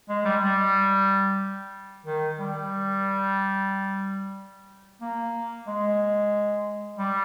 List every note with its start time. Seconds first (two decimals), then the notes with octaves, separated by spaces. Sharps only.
0.09 G#3
0.25 G3
0.42 G3
2.06 D#3
2.39 G3
5.02 A#3
5.67 G#3
6.99 G3